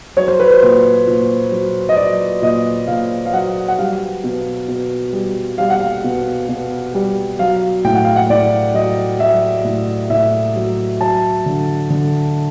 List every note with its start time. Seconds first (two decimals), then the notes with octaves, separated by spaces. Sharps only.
0.16 F#3 C#5
0.28 C5
0.40 B4
0.51 C5
0.62 A#2
1.07 A#2
1.52 F#3
1.89 D#5
1.97 F#3 D5
2.42 A#2 D#5
2.87 A#2 F5
3.26 F5
3.33 F#3 F#5
3.68 F#5
3.79 G3 F5
4.24 B2
4.68 B2
5.13 G3
5.58 G3 F5
5.70 F#5
5.80 F5
6.04 B2
6.49 B2
6.94 G3
7.39 F#3 F5
7.84 A2 G5
7.95 F#5
8.05 F5
8.16 F#5
8.30 A2 D5
8.74 F#3 D#5
9.19 F#3 E5
9.64 A2
10.10 A2 E5
10.56 F#3
11.01 F#3 A5
11.46 D3
11.90 D3